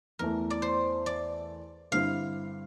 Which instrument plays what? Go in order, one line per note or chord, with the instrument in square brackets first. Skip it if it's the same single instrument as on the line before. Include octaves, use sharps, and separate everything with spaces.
[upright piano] E2 E3 A3 [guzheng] A#4
[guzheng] D5
C5
D5
[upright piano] G2 D3 G3 C4 E4 [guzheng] F5